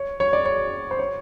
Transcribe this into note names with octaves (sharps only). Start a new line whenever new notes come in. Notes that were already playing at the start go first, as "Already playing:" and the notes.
Already playing: C#5
C#5
D5
C#5
C5
C#5